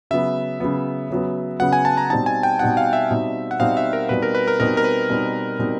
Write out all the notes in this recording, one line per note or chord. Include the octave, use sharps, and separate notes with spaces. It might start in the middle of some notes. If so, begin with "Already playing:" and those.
C#3 F#3 B3 E5
C#3 F#3 B3
C#3 F#3 B3
C#3 F#3 B3 F#5
G#5
A5
A#5
B2 G3 C4 D#4 A5
G#5
G5
B2 G3 C4 D#4 F#5
F5
E5
B2 G3 C4 D#4
F#5
B2 G3 C4 D#4 F5
E5
A#4
B2 G3 C4 D#4 B4
A#4
B4
A#4
B2 G3 C4 D#4 A#4
A#4
B4
B2 G3 C4 D#4
B2 G3 C4 D#4